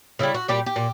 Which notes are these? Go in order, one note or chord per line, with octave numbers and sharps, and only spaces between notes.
C#3 E3 G3 E4
F#4
A#2 G3 G4
G4
A#2